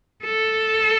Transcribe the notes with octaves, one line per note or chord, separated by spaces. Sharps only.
A4